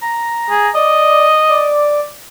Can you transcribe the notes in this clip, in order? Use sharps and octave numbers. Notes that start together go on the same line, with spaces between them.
A#5
G#4
D5 D#5
D5